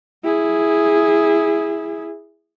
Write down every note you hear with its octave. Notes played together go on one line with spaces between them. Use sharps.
E4 G#4